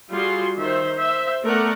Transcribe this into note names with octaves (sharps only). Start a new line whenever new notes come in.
G3 F4 F#4 G#4 C6
D#3 C5 E5
C5 E5
A3 B3 A#4 D5 F#5